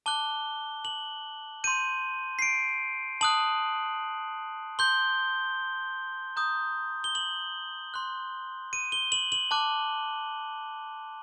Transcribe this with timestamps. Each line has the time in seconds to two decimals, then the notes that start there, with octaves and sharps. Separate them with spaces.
0.06 A5 D6 F#6 G7
0.85 F#7
1.64 C6 G6 D#7
2.39 C7
2.42 D7
3.21 A5 D#6 F#6 F#7
4.79 C6 G6 G7
6.36 A#5 D#6 G6
7.04 G7
7.15 F#7
7.94 C6 F#6
8.73 D#7
8.92 G7
9.12 F#7
9.32 F#7
9.51 A5 D6 F#6